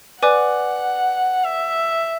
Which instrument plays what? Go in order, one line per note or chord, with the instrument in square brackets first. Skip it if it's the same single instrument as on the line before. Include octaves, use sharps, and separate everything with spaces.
[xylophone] B4 D5 G#5 D6 F#6 [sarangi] F#5
[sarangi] E5